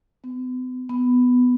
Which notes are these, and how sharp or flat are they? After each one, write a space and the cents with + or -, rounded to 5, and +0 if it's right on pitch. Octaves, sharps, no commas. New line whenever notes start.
B3 +45
B3 +10